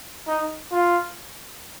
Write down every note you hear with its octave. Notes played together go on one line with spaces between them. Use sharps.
D#4
F4